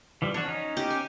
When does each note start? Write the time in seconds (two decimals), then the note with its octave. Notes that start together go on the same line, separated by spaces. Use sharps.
0.22 E3 F3 G3
0.34 D4 F#4 C#5
0.46 C#4 D#4
0.77 G4
0.90 G#5